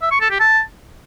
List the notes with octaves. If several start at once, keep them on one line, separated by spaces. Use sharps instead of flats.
E5
C#6
A4
G4
A5